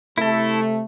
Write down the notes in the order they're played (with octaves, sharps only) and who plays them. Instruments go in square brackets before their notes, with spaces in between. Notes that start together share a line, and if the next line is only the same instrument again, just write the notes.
[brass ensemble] C3 A3 [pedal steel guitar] E4 A4